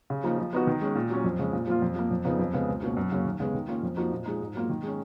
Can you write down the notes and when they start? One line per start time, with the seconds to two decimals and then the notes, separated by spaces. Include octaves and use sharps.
0.10 C#3
0.24 F3 A#3 D#4
0.39 F3
0.53 B3 D#4 F#4
0.67 D#3
0.81 G#3 C#4
0.96 A#2
1.10 F#3 C#4
1.24 F2
1.39 C#3 G#3 C#4
1.53 A#2
1.67 F3 A#3 F4
1.82 F2
1.96 F3 A#3
2.11 F2
2.25 C#3 F3 B3 D#4
2.39 F2
2.53 C#3 G#3 B3
2.68 C#2
2.83 B2 A#3 C#4
2.97 F#2
3.12 C#3 F#3 A#3 C#4
3.25 D#2
3.40 C#3 G#3 B3
3.54 D#3
3.68 A#3 C#4 F4
3.83 F2
3.97 F3 A#3 D#4 F#4
4.12 A#2
4.26 F3 G#3 D#4
4.41 G#2
4.55 F#3 A#3 F4
4.70 D#3
4.83 G#3 C#4